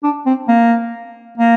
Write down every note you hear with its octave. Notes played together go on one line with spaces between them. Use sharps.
D4
C4
A#3
A#3